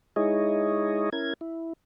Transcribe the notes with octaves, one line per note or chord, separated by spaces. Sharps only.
G#3 D#4 E4 G#4 C#5 D#5
C#4 E4 A#4 G#6
E4